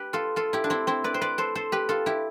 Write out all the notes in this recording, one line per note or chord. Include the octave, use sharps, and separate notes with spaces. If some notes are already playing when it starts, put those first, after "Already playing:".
Already playing: G4 B4
F4 A4
F4 A4
E4 G4
D4
C4 E4
C4 E4
B4 D5
C5
B4 D5
A4 C5
A4 C5
G4 B4
F4 A4
E4 G4